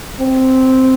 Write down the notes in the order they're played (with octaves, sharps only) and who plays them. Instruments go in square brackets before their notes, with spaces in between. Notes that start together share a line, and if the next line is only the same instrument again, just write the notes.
[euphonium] C4